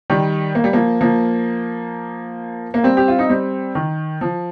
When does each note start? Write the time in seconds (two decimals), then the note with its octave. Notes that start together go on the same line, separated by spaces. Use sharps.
0.10 D#3 G3
0.55 A#3
0.64 G3
0.73 F3 A#3
1.01 F3 A#3
2.74 A#3
2.83 G3 C4
2.97 G4
3.08 F4
3.19 D#4
3.30 G3 C4
3.75 D#3
4.21 F3